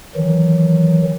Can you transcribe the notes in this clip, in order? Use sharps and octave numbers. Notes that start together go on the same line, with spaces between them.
D#3 E3 F#3